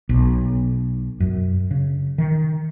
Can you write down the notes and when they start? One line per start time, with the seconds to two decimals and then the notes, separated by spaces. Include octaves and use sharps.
0.09 B1
1.20 F#2
1.71 C#3
2.18 D#3